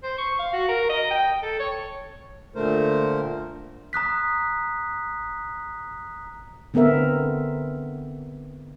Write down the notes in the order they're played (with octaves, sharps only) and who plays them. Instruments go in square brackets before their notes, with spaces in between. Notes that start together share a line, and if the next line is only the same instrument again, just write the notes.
[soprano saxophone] C5
C#6
F5
F#4
A#4
D#5
G5
A4
C#5
[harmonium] A#2 D3 A3 A#4 C5
[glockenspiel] A#5 D#6 F#6 B6
[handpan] D3 B3 C4 A#4 E5